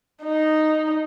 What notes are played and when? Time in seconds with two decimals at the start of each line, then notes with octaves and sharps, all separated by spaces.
0.23 D#4